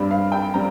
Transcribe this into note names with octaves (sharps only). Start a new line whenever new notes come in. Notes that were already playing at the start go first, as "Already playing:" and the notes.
Already playing: G2 G3 C4
F5
G5
G3 C4 A#5